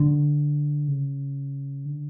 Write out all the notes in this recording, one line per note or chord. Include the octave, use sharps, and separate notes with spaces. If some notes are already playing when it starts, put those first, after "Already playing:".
Already playing: D3
C#3
D3